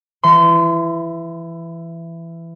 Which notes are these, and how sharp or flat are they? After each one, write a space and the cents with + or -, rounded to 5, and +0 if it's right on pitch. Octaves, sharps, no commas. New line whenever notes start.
E3 +15 C6 -30